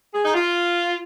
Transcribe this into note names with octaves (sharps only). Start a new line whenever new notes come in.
G#4
D#4
F4